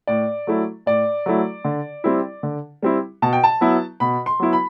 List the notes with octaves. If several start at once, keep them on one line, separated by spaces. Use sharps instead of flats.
A2 D5
F#3 A3 E4
A2 D5
F#3 A3 E4
D3
G3 C4 E4
D3
G3 C4 E4
B2 A5
G5
A5
F#3 B3 E4
B2 B5
C6
F#3 B3 E4
B5